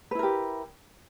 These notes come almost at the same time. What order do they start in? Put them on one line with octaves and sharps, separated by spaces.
B4 E4 A#4 G4